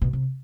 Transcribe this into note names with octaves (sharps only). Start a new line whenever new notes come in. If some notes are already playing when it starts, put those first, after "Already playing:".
B2
C3